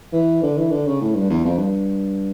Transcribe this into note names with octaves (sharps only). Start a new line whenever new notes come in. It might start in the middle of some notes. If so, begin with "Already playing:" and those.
E3
D3
E3
D3
C#3
A2
G2
E2
F2
G2